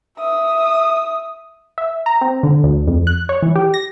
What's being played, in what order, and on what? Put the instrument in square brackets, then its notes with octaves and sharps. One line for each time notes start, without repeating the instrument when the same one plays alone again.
[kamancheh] E5 D#6
[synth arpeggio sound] E5
A#5
C4
D3
D2
F2
F#6
C#5
E3
G4
A#6